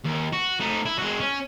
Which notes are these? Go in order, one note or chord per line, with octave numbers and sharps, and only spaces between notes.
D#2
F#4
A3 D#4
E4
G#3 F#4
C#4